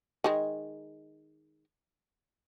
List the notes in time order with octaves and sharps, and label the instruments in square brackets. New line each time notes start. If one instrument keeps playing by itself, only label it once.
[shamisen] D#3 G#3